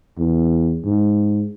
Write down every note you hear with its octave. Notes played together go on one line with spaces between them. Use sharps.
E2
G#2